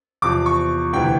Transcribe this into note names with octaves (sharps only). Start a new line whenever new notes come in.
E2 C3 F3 D6
C#6
D2 C3 E3 G5